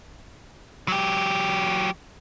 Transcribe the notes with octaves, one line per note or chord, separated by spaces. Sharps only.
F#3 G4